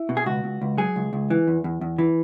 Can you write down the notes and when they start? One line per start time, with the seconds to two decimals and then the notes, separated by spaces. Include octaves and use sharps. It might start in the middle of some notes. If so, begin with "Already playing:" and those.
Already playing: E4
0.09 B2
0.17 G#4
0.26 C#2 F#4
0.44 C#2
0.62 C#2
0.78 F#3 G#4
0.96 C#2
1.13 C#2
1.30 E3
1.48 E2
1.64 E2
1.81 E2
1.98 E3